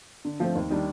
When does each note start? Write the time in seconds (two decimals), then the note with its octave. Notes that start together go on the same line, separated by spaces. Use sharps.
0.25 D3
0.40 F3 A3 C4
0.55 D#2
0.70 D#3 G3 D4